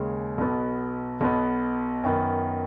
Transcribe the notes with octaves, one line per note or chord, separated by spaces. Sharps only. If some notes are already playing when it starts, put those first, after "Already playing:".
Already playing: D#2 C#3 G#3
B1 B2 B3
B1 B2 B3
F#2 D#3 B3